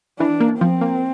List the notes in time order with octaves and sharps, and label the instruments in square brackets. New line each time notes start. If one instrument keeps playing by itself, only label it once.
[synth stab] E3 [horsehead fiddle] D4
[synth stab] A#3
[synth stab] F3 [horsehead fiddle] C4
[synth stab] A#3